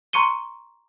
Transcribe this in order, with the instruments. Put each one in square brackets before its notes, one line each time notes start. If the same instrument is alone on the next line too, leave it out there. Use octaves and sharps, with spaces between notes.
[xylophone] A#5 C6 C#6 C#7 D#7 G7